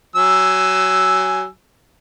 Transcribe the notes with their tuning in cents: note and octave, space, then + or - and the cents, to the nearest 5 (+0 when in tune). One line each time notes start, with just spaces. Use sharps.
F#3 +25 G#5 +0 E6 +0